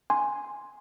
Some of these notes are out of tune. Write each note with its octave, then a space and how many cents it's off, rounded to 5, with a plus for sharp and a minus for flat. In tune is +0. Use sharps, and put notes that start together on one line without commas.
G#5 +0 C6 +0